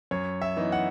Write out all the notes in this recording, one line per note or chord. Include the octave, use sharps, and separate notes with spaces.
F#2 C#5
E5
E3 B3 D#4
F#5